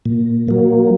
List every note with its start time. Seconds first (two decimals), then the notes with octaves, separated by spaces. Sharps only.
0.05 A#2
0.48 F#3 A#3